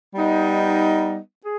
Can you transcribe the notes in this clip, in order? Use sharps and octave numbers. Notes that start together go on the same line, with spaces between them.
G3 B3 D#4
G#4